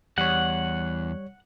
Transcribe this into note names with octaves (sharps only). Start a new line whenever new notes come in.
E2 G3 C#5 F#5